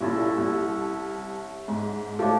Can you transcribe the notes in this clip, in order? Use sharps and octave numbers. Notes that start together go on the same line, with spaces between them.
C2 A#2 C#4 E4 A4
C2
G#2
A2 F3 D4 E4 A4